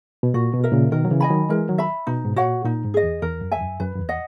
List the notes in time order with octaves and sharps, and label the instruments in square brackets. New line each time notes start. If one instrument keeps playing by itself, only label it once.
[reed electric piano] B2
[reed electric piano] A#2 [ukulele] F#4
[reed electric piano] B2
[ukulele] A#4 E5
[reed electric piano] A#2 C#3
[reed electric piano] B2 D#3 [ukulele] A#4
[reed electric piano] F#3
C#3 E3
[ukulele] D#5 G#5 B5
[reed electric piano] D#3 F#3
[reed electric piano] E3 G#3 [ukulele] A#4
[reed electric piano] D#3 F#3
[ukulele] E5 B5
[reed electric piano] B2 [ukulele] D#4
[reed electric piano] G#2
[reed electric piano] A#2 [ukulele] F#4 C#5 F#5
[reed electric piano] A#2 [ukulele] D#4
[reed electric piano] G#2
[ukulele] G#4 D#5
[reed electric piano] E2
[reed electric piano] E2 [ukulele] A#4
[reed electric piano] F#2
[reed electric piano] E2 [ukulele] E5 G#5
[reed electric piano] F#2
[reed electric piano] F#2 [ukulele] B4
[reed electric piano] F#2
E2
[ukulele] D#5 F#5